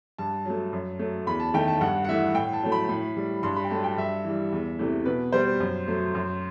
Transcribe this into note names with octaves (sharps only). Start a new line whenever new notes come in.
G2 A5
F#3 A3
F#2
F#3 A3
E2 B5
A5
D#3 A3 G5
A5
G2 F#5
F#5
E3 A3 E5
A2 G5
A5
F#3 A3
B5
A2
G3
G2 C6
B5
G5
F#3 A3 A5
G5
G2 E5
E3 G3
E2
C3 E3 A3
B2 B4
G3 C5
F#2
F#3 A3
F#2